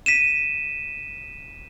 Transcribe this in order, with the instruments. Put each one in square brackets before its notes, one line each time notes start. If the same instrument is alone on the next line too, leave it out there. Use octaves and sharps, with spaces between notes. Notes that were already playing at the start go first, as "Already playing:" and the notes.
[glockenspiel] B6 D#7 E7